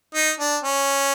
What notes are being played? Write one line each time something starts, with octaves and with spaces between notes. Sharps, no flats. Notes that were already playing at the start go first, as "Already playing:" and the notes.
D#4
D4
C#4